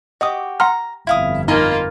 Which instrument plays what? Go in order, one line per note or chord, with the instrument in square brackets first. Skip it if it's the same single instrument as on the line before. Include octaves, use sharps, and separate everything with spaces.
[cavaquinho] F#4 G4 D6 [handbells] D#5 D#6
[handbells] F#5 C6 F6 [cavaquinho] A#5
[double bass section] G1 F2 [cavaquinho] E4 F5 D#6
[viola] A#3 F4 [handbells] D#4 [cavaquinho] D#5 G#5 B5